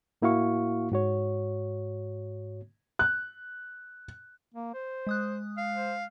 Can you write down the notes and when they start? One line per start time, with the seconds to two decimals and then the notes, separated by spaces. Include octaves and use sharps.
0.22 A2 A#3 E4 F#4 F5 C#6
0.92 G#2 F#4 C#5
2.99 F#6
4.54 A#3
4.74 C5
5.07 G#3 D#6 F#6
5.57 F5
5.74 C5